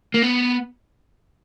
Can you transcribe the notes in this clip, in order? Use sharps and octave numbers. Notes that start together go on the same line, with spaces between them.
A#3
B3